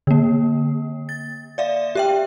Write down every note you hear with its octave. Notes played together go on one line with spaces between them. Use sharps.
D3 A#3
A6
D5 E5 F5
G4 E5 G5